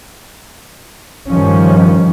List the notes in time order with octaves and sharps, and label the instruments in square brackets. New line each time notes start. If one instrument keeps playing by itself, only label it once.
[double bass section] G2 D#3 F3 C#4